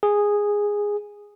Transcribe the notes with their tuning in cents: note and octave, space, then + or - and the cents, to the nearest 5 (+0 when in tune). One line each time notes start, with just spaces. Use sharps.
G#4 -10